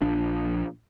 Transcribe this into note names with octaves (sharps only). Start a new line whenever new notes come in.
A#1 F3 D4